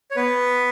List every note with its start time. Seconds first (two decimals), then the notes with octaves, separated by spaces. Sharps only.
0.11 C#5
0.16 B3 B4